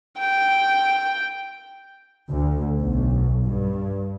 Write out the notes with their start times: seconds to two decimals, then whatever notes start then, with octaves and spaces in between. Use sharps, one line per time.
0.19 G5
2.30 D2
2.79 B1
3.45 G2